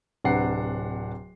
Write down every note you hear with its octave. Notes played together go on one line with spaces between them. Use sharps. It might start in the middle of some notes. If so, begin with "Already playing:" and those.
D1 C3 D4 B4 F#5 C7